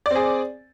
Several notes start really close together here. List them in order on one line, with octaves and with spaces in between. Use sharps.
D5 C4 G#4